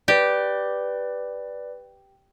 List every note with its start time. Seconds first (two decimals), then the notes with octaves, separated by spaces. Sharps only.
0.08 G4 B4 D5